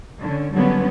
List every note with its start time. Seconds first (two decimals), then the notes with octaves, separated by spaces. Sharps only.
0.19 D3 C#4
0.53 D3 F#3 G3 A#3 B3 C#4